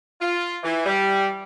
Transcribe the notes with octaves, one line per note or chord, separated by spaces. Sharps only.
F4
E3
G3